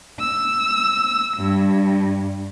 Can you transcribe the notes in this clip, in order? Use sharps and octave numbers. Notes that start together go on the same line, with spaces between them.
E6
G2